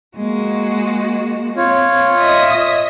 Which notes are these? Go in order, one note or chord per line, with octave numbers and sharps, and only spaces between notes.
G#3 A#3 F#4
C4 F4 C#5
D#5 E5 D#6